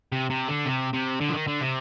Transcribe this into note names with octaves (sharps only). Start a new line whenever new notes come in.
C3
C3
D3
C3
C3
D3
F3
D#3
D3
C3